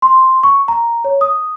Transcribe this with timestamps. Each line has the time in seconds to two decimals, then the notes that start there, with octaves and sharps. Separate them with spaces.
0.02 C6
0.43 C#6
0.68 A#5
1.05 C#5
1.21 D#6